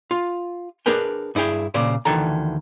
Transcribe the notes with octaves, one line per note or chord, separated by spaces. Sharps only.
F4
D4 G#4 A#4 B4 G5
G2 D#4 E4 G#4 G5
A#2 C#3 C5 D5
D2 D#3 E3 A4 A#5